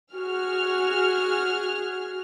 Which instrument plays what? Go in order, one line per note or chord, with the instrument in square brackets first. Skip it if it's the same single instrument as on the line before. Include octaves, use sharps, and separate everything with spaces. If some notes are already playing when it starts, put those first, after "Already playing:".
[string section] F#4 G#4 F6